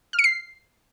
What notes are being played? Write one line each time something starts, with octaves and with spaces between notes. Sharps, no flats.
F6
C#7
C7